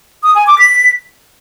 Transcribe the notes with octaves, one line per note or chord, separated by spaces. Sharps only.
D#6
G#5
D6
B6